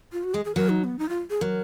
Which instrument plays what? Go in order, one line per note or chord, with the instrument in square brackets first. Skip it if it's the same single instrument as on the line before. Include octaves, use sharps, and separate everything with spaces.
[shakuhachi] F4
F#4
[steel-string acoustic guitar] G#3 [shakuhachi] G#4
[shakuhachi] G#4
[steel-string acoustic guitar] F#3 [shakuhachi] A#4
[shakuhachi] D#4
B3
D#4
F4
G#4
[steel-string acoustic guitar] F#3 [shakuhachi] A#4